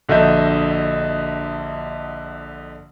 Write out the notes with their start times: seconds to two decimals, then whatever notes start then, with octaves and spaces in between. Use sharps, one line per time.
0.09 A#1 D3 F#4 D#5 E5 G6